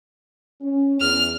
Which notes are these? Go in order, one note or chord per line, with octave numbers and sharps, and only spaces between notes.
C#4
E2 F6